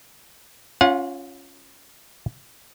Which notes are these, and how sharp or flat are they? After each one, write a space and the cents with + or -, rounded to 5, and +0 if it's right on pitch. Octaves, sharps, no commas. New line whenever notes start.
C#4 +0 F4 +0 F#5 -40